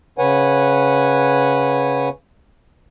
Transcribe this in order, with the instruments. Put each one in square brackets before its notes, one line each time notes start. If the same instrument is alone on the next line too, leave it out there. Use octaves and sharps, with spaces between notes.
[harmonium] C#3 B4 C#5 F#5 G#5